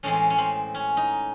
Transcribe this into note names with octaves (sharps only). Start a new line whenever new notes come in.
A2 E3 G#3 C4 C#4
C#4
C4
C#4
D#4